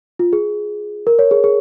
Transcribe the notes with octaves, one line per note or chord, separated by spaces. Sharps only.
F4
G#4
A#4
C#5
G#4
G#4